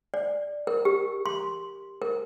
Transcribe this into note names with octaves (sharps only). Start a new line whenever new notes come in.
D5
A#4
G4
C6
A#4